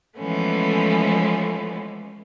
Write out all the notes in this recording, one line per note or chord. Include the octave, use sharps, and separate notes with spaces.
E3 F3 G#3 A3 B3 C#4